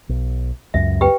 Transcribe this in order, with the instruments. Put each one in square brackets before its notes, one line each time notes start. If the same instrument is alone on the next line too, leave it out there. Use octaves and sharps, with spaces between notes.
[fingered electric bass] B1
[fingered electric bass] C#2 F#2 [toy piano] E5
[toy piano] G4 B4 G5